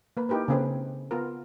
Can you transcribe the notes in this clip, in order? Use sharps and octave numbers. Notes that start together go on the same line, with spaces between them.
A#3 B4
D#4 E4 G4 A#4 B4
C#3 A#3 C4 G#4 A4 B4
B3 F4 A#4